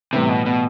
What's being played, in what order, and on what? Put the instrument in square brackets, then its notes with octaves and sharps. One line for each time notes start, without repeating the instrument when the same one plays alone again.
[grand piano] A2 E3 G3 B3 E4 [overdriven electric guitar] C3
[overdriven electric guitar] B2
B2